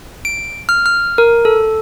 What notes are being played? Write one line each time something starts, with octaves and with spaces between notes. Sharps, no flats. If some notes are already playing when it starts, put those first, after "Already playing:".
D7
F6
F6
A#4
A4